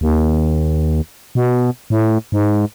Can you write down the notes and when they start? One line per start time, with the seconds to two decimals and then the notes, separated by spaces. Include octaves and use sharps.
0.01 D#2
1.35 B2
1.90 A2
2.32 G#2